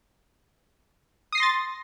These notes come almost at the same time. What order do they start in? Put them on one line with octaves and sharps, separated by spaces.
D#6 C7 A#6 C6 A6